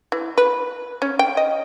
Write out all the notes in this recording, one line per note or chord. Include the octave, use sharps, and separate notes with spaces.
E3
B4
C#4
G5
D#5